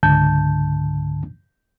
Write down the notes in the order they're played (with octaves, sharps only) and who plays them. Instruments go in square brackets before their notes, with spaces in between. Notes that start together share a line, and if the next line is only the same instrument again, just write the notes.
[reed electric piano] C#2 G#2 D3 A5 G6